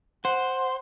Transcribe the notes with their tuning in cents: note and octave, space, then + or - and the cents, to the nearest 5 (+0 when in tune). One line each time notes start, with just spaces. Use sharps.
C5 +0 F#5 +0